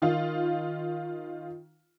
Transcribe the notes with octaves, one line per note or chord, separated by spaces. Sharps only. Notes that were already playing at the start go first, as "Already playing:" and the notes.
D#3 F4 F5